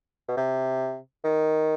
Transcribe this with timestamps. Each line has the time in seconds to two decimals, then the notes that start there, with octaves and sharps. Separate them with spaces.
0.28 B2
0.37 C3
1.24 D#3